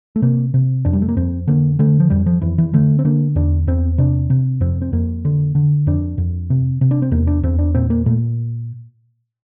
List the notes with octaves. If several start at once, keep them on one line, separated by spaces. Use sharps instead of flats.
A3
C3 A#3
C3
F2 D4
G3
A3
A#3
F2 C4
D3 A#3
D3 A3
F3
F2 G3
F3
F2 E3
E3
D3 A3
C4
D3 A#3
E2 D4
E2 C4
C3 D4
C3
F2 C4
C4
F2 A#3
D3
D3
F2 D4
F2
C3
C3
D4
C4
E2 A#3
D4
E2 C4
D4
A#2 C4
A#3
A#2 A3